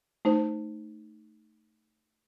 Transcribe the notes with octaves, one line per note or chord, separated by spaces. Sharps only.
A3 D#4 C5